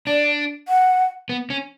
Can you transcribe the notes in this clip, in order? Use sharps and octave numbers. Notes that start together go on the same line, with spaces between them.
D4 D5
F#5
B3
C#4